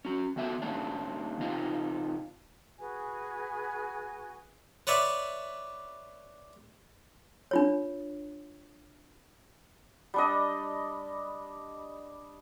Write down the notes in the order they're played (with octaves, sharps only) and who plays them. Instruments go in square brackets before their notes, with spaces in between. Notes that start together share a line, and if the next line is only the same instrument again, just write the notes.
[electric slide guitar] C#4 F#4
D#3 B3 F#4 E5
D#3 A#3 C#4 D4
C3 D#4 F4
[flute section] F#4 G#4 B4 G#5
[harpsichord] B4 C#5 D5 E5
[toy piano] D4 F4 C#5
[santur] G3 D4 D#5